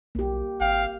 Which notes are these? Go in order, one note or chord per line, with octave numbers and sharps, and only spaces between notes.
B1 A#3 G4
G#1 F5 G5